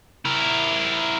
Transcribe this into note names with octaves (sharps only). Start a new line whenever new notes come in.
E4 A#4